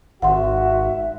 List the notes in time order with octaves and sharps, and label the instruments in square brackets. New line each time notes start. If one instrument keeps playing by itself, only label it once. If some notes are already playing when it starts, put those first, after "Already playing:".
[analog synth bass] G#1 [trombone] F#4 [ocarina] E5 [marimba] F#5 C6